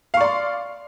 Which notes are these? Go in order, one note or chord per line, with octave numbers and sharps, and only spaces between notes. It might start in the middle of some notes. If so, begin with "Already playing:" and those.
D5 F5 C6 C#6